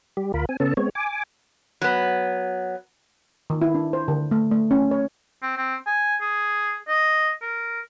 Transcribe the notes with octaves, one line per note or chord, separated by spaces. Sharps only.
G3 G4
D2 F4 A#4 B5
C4 G#5
C#3 B3 C#4 A4 A5
G#3 B3 C4 C#5
G#5 D6
F#3 B3
D#3
E4
D4
C5
D3
A3
A3
C#4
C#5
C4
C4
G#5
G#4
D#5
A#4